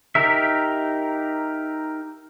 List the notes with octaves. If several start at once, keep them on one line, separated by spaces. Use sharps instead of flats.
D#4 G4 A#4 E5